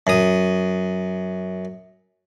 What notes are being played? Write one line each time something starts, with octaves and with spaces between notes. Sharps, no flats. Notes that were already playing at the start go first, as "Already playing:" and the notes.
F#2 D#6